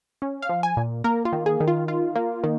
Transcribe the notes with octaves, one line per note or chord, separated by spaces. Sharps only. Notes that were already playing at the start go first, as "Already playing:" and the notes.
C#4
F5
F3
G#5
A#2
A#3 A#4
F4
D#3
G#4
D#3
F4
F4
A#3
D#3